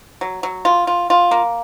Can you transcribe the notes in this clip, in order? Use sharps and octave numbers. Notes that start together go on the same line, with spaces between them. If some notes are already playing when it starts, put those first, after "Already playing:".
F#3
F#3
F4
F4
F4
A#3